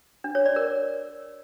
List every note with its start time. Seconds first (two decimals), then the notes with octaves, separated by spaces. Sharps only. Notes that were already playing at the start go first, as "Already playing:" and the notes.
0.24 D4
0.35 C#5
0.46 D5
0.56 A#4